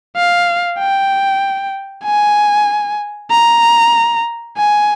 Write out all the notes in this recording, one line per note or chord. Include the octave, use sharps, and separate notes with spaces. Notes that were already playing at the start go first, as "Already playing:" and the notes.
F5
G5
G#5
A#5
G#5